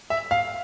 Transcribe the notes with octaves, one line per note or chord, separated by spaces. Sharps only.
E5
F5